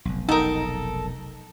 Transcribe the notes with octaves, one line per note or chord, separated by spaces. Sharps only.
F1 B1
D#4 A4 A#4